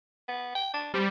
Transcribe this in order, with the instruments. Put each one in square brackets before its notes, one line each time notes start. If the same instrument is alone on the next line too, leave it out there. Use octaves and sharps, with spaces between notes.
[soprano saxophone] B3
G5
D4
[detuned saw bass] G3 [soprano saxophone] C4